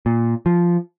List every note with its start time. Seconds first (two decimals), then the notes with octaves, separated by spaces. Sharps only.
0.06 A#2
0.46 F3